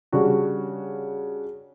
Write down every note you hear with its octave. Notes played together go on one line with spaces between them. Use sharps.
C#3 G3 D4 F#4